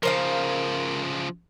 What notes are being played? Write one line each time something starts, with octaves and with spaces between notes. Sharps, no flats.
C#3 F3 A#4 C5 F5